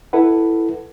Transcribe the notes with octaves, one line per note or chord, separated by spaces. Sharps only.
E4 A4 B4 F#5